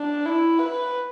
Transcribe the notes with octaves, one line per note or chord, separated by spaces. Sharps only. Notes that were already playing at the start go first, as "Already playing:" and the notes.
Already playing: D4
E4
B4